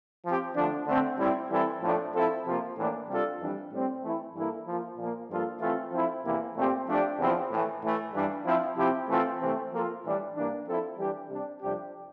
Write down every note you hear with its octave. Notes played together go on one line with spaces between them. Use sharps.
F3 C4 G4
D3 F3 A3 D4
D3 A3 C4
A2 G3 C4 E4
E3 G3 C4 E4 A4
A2 F3 A3 D4
F3 C4 E4 A4
C3 F3 A#3 F4
A2 E3 A#3 D4
C3 G3 D4 F4 A4
F2 E3 G3 D4
A2 G3 C4 G4
E3 A3 E4
G2 E3 A#3 E4 A4
F3 A#3 F4
A#2 F3 A#3
G2 F3 A#3 F4 A4
E3 A3 C4 F4 A4
F3 C4 E4 A4
E2 C3 E3 A#3 E4
A#2 A3 C4 G4
F3 A3 D4 G4
E2 C3 F3 C4 E4
A2 E3 A3
A2 E3 A3
G2 E3 G3 D4
F3 C4 E4
C3 F3 C4 E4 G4
E3 A3 C4 F4 A4
C3 E3 A3 C4
F3 A#3 F4 A4
A2 E3 G3 D4
G2 E3 A#3 D4
F3 C4 E4 A4
E3 G3 D4 G4
C3 G3 D4
F2 C3 G3 D4 G4